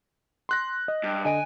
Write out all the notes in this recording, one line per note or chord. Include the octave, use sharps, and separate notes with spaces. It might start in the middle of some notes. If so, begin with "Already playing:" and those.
C6 F#6 A#6
D#5
G2
D3 D#5 G#5 D7